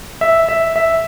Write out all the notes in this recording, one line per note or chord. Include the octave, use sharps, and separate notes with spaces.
E5
E5
E5